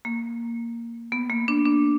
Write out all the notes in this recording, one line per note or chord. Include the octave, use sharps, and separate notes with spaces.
A#3
B3
A#3
D4
D4